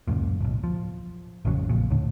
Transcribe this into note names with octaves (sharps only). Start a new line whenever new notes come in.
D1 C#2 F#2 A#2
D1 B1
F3
A1 F2 C#3 F#3
A#1 F2 A#2
D2 A2 D3